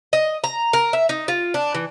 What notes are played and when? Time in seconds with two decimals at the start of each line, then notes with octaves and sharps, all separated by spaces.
0.13 D#5
0.44 A#5
0.73 A#4
0.93 E5
1.09 D#4
1.28 F4
1.54 D4
1.74 E3